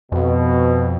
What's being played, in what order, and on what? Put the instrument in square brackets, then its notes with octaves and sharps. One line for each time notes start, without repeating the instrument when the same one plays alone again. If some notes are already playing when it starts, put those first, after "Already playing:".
[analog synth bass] F2 [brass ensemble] B2